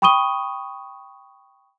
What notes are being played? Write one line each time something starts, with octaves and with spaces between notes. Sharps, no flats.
G5 B5 C#6 D#6 D#7 G7